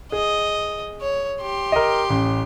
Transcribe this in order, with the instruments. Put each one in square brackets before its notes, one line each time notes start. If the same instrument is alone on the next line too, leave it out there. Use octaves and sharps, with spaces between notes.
[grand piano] G#4 [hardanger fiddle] D#5
[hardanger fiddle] C#5
G4 C6
[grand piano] A#4 D#5
A1